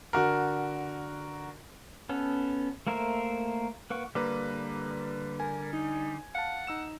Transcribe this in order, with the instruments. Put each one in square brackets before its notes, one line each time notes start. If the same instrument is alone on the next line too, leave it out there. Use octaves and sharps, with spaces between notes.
[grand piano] D3 F#4 A#4
[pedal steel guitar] B3 C#4 A4
A3 A#3 A#4 C5 E5
A#3 B4 F#5 C#6
[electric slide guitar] D3 G3 [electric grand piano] A#3 B4 A#5
[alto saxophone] A#4 [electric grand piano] G#5
[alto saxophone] D#4
[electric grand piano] F5 A5 [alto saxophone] F#5
[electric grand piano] D#4 E6 E7